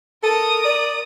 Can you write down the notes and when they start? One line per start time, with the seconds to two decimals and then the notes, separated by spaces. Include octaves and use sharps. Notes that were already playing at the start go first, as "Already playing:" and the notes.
0.23 A4 A#4 D#6
0.65 D5